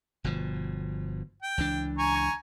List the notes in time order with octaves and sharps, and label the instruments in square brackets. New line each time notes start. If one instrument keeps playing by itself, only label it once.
[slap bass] G1 B2 F3
[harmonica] G5
[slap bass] C#2 E3 D4
[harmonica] G#5 A#5 C#6